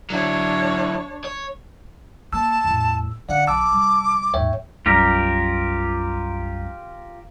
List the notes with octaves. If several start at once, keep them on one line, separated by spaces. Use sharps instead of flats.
F#3 D4 E4 C#5
C#5
A#3 A5 E6
E2 A2
D3 D4 D5 F5 F#5
B1 A5 D6 E6
C3 G3
D#2 G#2 C#5 E5 G5
B1 F#2 G3 F4 G4 A#4